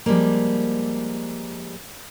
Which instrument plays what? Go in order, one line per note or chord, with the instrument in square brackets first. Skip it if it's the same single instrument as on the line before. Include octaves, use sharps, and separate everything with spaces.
[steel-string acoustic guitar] F3 G3 G#3 A#3